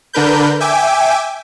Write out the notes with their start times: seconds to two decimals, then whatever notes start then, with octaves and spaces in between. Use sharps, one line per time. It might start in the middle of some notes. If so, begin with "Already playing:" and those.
0.13 D3 D4 A#4 B4 G6
0.60 E5 G5 G#5 D6